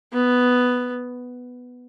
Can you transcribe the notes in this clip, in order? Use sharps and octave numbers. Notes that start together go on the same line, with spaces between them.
B3